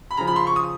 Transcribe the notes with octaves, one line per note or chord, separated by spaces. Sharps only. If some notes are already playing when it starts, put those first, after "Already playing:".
B5
C#3 F3 A#5
B5
C6
C#6
D#6